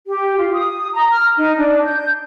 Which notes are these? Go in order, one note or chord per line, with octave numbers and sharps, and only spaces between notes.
G4
F4
D#6
A#5
F6
D#4
D4
G6